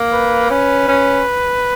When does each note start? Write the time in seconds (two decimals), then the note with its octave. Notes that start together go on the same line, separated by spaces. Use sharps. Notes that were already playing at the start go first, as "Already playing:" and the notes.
Already playing: A#3
0.13 B4
0.51 C#4 B4
0.88 C#4